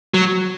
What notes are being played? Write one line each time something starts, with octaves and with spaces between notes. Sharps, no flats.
F#3